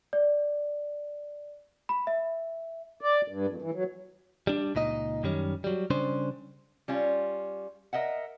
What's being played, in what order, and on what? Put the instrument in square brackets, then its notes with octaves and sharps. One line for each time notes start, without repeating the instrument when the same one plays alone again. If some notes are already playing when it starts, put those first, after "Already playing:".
[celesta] D5
B5
E5
[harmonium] D5
G2
F2
E3
F#3
[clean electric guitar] G3 D4
C#2 A#2 D#4 D#5
F#2 D#3 G3 C#4
F#3 G3
C#3 G3 C#4 D4 C5
[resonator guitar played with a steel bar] G3 C#4 F4
A#4 D#5 E5 F#5